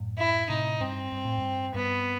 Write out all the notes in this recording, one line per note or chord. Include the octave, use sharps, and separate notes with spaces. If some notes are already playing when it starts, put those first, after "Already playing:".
Already playing: F#2 A2
E4
A2 C3 D#4
G2 C4
G2
A2
G2
G2 B3